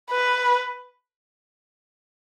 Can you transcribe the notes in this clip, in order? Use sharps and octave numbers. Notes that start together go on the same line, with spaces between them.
B4